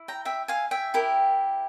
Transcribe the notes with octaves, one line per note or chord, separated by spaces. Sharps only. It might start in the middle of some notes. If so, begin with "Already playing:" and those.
Already playing: E4
G5 A#5
E5 G5
F5 G#5
E5 G5
E4 G4 A#4